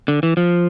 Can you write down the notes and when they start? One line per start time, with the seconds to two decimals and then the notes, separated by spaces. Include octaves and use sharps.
0.08 D3
0.23 E3
0.37 F3